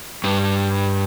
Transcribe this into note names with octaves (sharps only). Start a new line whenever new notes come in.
G2